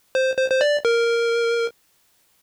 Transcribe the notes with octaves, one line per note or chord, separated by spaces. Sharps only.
C5
C5
C5
D5
A#4